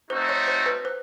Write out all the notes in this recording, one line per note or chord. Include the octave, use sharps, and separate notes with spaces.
A3 C4 D#4 F#4 C5
C#5
C5
B4
C5